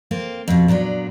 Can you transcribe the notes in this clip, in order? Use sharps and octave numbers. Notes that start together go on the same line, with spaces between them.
A#3 C4 F4
F2 B2
A#2 F#3 B3 D4